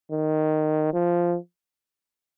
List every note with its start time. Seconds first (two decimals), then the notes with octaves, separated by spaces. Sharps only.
0.12 D#3
0.94 F3